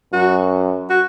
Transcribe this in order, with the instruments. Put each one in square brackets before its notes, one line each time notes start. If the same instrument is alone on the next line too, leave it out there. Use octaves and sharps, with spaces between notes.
[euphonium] F#2 [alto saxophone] F#4
[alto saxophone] F#4